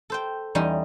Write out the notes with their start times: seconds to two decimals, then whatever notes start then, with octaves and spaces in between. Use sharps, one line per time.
0.10 A4 C5 G5
0.55 E2 G3 C#4 D#4 C6